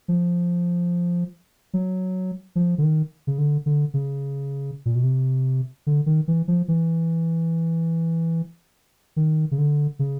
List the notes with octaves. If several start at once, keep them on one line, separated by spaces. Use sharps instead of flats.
F3
F#3
F3
D3
D#3
C#3
D3
D3
C#3
A#2
B2
C3
D3
D#3
E3
F3
E3
D#3
C#3
D3
C#3